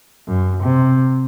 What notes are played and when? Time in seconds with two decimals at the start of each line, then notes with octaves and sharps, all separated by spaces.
0.27 F#2
0.63 C3